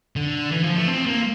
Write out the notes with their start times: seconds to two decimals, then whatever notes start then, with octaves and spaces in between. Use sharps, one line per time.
0.16 D3
0.51 E3
0.63 F3
0.75 A3
0.87 C4
1.06 A#3